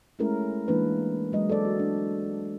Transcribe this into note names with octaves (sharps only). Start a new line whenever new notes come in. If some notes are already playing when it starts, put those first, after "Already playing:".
G#3 A3 C#4 E4 G#4 A#4
E3 G#3 A#3 D4 B4
F#3 G#3 D#5
A4 C5 D5
F#4
D4